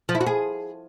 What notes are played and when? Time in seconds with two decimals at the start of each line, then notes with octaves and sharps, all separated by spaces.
0.09 F3
0.15 E4
0.21 F#4
0.26 G#4